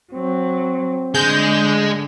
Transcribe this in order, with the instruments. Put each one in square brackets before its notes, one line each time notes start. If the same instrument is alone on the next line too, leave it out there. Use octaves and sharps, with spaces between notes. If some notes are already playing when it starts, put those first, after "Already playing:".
[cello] F#3 [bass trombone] C4
[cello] D3 [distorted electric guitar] G#3 G#4 [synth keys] G6